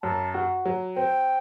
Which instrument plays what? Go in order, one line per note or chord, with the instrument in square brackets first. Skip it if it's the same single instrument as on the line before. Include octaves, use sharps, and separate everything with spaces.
[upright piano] F#2 [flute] A5
[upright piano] F#4
F#3
[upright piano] C4 [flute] G5